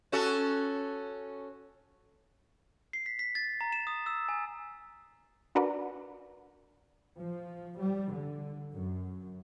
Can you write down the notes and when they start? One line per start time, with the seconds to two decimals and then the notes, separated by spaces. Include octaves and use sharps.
0.12 C#4 F#4 A4
2.93 C7
3.06 B6
3.19 B6
3.35 A6
3.61 A#5
3.72 E7
3.87 D#6
4.06 E6
4.29 G#5
5.55 D4 F#4 A#4 B4 D5
7.20 F3
7.80 G3
8.13 D3
8.73 F#2